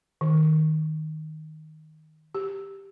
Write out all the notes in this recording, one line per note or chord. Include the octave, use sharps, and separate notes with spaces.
D#3
G4